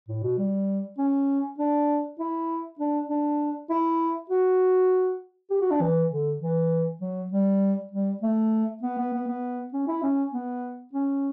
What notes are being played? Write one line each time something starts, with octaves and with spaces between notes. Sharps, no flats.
A2
B2
G3
C#4
D4
E4
D4
D4
E4
F#4
G4
F#4
D4
E3
D3
E3
F#3
G3
G3
A3
B3
B3
B3
B3
C#4
E4
C#4
B3
C#4